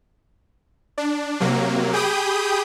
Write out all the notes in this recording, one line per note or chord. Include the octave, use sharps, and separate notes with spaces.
D4
C3 F#3 A#3
G4 G#4 G5 B5 D#6 G6